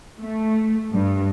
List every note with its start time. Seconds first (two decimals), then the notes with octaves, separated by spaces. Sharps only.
0.21 A3
0.94 G2